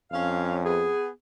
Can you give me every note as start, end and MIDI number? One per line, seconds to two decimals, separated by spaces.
0.11 0.92 41
0.11 0.59 61
0.11 0.59 77
0.65 1.08 59
0.65 1.08 68